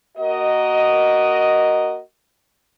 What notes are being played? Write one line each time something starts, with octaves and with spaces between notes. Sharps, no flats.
A#3 F#4 A#4 D#5